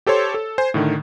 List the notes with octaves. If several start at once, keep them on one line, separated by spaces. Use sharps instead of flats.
G4 A4 C5 C#5 C6
A4
C5 G#5
A2 D3 D#3